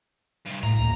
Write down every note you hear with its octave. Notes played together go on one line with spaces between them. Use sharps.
G2 C3
A2 A#5
D1 A#2